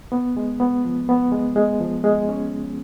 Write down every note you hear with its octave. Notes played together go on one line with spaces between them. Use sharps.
B3
G#3
B3
F3
B3
G#3
G#3
F3
G#3
C#4